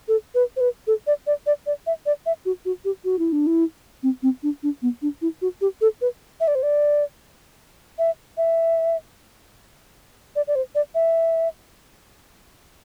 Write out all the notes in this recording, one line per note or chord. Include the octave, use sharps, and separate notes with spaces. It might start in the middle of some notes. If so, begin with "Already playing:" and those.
A4
B4
C5
B4
A4
D5
D5
D5
D5
E5
D5
E5
F#4
F#4
G4
F#4
E4
D4
E4
C4
C4
D4
D4
B3
D4
E4
F#4
G4
A4
B4
E5
D5
C5
D5
E5
E5
D5
D5
C5
D5
E5